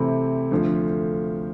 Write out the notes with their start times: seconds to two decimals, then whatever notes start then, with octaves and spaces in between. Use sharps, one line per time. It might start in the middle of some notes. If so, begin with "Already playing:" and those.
Already playing: C3 E3 A3 C4 E4
0.51 D2 D3 F3